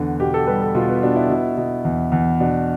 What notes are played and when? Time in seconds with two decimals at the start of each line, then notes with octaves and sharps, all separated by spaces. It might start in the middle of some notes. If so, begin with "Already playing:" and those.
Already playing: E2 D3
0.20 B2 G4
0.34 A4
0.47 G3 B4
0.62 A4
0.75 B2 F4
0.89 B3
1.03 B2 D4
1.16 E4
1.30 B2
1.57 B2
1.85 E2
2.12 E2
2.40 B2 D4